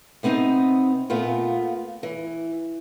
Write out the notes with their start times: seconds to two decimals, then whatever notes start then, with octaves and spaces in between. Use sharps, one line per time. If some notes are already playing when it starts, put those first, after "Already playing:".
0.23 C3 B3 C4 D#4
1.10 A#2 A3 B3 F4
2.03 E3